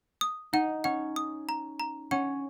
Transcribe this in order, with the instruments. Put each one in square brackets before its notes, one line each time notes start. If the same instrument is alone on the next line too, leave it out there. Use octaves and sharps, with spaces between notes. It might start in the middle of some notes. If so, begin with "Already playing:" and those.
[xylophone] D#6
[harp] D#4 [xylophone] F#5
[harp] C#4 [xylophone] F#5
[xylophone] D#6
A#5
A#5
[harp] C#4 [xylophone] F#5